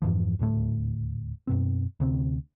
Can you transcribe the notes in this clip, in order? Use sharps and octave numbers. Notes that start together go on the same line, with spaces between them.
F2 G#2 E3 F3
D#1 D2 A2 A3
F#2 B2 C4
D2 C3 C4